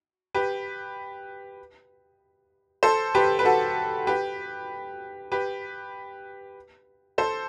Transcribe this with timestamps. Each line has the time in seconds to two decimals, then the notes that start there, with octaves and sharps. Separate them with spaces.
0.34 G4 B4
2.83 A4 C5
3.15 G4 B4
3.39 B4
3.45 F#4 A4
4.07 G4 B4
5.32 G4 B4
7.18 A4 C5